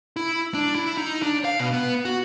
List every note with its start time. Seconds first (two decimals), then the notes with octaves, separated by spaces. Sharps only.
0.16 E4
0.54 D4
0.75 E4
0.98 D#4
1.22 D4
1.45 F5
1.59 B2
1.73 B3
2.05 F#4